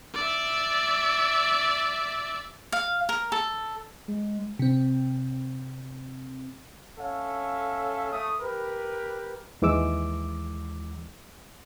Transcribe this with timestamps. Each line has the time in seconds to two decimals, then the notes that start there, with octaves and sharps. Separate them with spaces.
0.14 D5 E5
2.72 F5
3.09 A#4
3.32 A4
4.08 G#3
4.59 C3 C4
6.99 C#4 A4 E5 F5
8.12 A3 D#6
8.41 G4 A#4 B4
9.62 D#2 E3 G#3 D6 E6